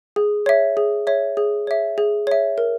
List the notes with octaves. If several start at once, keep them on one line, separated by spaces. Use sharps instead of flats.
G#4
C#5 E5
G#4
C#5 E5
G#4
C#5 E5
G#4
C#5 E5
A#4